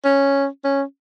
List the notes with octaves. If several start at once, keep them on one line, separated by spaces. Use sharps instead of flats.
C#4
C#4